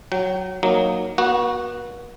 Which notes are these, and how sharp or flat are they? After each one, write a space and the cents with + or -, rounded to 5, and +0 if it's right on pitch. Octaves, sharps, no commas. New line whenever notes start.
F#3 +0 G5 -35
F#3 +0 A#3 +0 D#4 +0
B3 -45 F#4 +0